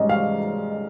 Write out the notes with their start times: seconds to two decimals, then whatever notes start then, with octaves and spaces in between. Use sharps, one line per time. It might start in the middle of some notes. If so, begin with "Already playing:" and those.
Already playing: G#2 G3 C#4 D#5
0.09 F5